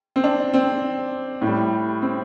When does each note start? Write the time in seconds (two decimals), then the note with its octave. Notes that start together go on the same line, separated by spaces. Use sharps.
0.16 C4
0.24 D4
0.54 C4
1.41 A2
1.47 G3
2.02 C4